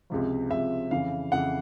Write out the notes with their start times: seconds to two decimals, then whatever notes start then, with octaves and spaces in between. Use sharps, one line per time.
0.10 C#2 C3 F3
0.50 C#2 C3 F3 E5
0.91 F2 C#3 E3 F5
1.32 F2 C#3 E3 F#5